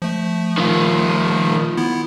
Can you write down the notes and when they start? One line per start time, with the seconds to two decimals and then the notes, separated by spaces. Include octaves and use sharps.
0.02 F3 A3
0.57 D#3 F4
1.77 B3 E4